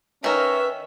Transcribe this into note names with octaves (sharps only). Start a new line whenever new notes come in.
D#3 C#4 A#4 B4 E5